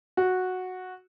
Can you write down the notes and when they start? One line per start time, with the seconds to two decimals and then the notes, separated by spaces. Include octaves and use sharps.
0.17 F#4